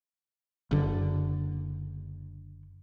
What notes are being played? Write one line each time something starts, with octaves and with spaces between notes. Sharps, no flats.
F#1 D3